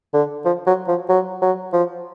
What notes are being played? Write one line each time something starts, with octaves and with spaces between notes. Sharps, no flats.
D3
F3
F#3
F3
F#3
F#3
F3